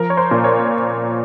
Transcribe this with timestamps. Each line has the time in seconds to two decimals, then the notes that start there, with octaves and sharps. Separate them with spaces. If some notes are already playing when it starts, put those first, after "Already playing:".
Already playing: F3 A#4
0.10 C#5
0.17 C5
0.31 A#2
0.44 C#5